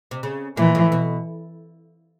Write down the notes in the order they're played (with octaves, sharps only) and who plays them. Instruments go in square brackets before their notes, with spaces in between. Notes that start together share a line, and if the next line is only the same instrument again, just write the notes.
[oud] C3
C#3
[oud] A#2 [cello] E3
[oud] A2
B2